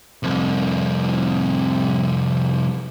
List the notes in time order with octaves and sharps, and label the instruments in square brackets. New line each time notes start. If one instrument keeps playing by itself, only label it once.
[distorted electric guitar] C2 F2